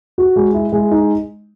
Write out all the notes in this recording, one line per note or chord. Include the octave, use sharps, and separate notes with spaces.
F#4
G#3
E4
G#3
D#4